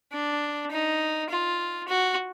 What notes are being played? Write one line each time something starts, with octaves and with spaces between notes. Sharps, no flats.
D4
D#4
F4
F#4